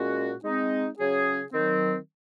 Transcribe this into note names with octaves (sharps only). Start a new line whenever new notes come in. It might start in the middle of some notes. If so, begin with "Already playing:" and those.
Already playing: A#2 G#3 C#4 F#4
G#3 C4 D#4
C#3 F#3 C#4 G#4
D#3 F#3 C4